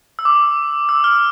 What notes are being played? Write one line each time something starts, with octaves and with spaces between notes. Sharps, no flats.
E6
D6
E6
F6